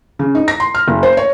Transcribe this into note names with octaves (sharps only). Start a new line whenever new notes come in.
C#3
D#4
A#6
C6
F6
F#1
C5
C#5